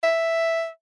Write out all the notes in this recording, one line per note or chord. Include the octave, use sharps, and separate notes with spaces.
E5